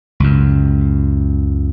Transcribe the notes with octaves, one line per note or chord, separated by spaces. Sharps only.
C#2 F#2